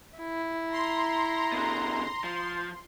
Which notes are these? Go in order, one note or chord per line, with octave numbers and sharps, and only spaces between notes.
E4
A#5 C6
B2 D3
F3